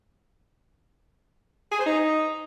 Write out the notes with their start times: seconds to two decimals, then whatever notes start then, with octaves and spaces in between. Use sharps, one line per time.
1.71 G#4
1.78 C5
1.86 D#4